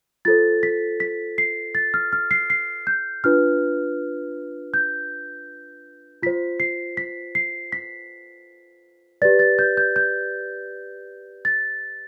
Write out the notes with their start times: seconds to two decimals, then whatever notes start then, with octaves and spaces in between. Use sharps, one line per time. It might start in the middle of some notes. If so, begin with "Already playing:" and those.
0.25 F4 A4 C5 A6
0.63 B6
1.00 B6
1.38 C7
1.75 A6
1.94 F6
2.13 F6
2.31 C7
2.50 C7
2.87 G6
3.24 D4 F4 B4 F6
4.74 G6
6.22 F4 C5 B6
6.60 C7
6.97 B6
7.35 C7
7.72 B6
9.22 G4 B4 D5 A6
9.39 A6
9.59 G6
9.77 G6
9.96 G6
11.45 A6